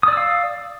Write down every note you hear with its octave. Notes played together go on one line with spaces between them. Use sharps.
D5 F5 D#6 E6